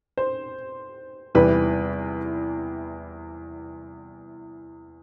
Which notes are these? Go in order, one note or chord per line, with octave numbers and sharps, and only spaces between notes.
C5
E2 C3 E3 G3 B4